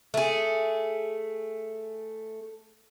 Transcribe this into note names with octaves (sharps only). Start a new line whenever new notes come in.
A3 G#4